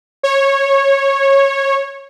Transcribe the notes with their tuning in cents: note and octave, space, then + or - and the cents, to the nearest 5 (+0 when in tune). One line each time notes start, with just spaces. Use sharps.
C#5 -15